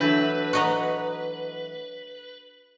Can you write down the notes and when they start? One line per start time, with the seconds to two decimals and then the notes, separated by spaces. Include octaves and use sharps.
0.01 E3 F#3 A3 D4 B4 G6
0.53 F#4 D#5 A#5